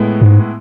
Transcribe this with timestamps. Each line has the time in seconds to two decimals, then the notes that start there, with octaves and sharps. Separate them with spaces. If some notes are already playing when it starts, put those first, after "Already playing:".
Already playing: A2 G#3 B3 E4
0.21 G#2